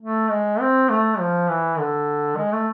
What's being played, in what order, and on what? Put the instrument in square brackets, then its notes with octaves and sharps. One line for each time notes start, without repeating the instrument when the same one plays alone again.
[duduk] A3
G#3
C4
A3
F3
E3
D3
G#3
A3